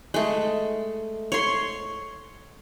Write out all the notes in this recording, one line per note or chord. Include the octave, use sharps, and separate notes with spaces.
G#3 A3
C#5 C6